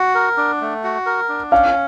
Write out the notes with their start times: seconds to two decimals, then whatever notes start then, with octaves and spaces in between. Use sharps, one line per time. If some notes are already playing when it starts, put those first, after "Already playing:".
Already playing: F#4 F#5
0.15 A#4
0.37 D4
0.61 A3
0.84 F#4
1.06 A#4
1.29 D4
1.52 C#4 F5